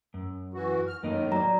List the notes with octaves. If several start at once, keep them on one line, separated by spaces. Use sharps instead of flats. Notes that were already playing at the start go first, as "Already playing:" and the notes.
F#2
E3 F#4
F6
F#2 A2 D#3 A#3 D#4
F#3 D5 A#5